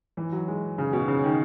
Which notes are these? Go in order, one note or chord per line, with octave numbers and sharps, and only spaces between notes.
E3
F#3
G#3
C#3
B2
C#3
D#3